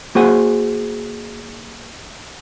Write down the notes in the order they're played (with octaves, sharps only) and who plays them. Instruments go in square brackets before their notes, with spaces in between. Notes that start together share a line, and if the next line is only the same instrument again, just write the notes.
[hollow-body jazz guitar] A#3 F#4 G#4 C5 F#5 G#5